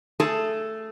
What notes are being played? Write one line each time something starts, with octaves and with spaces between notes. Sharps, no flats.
A3 G#4 A4 A5